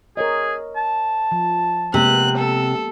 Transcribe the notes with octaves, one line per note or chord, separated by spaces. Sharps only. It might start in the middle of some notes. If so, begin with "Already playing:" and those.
G#4 A#4 C#5 D#5
A5
F3
C3 G#3 A#3 B3 F#6
A4